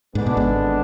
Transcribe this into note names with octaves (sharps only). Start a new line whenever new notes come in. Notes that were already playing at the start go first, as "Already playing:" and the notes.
G#2 D3 G#3 B3 D4
B2
G#1 G#2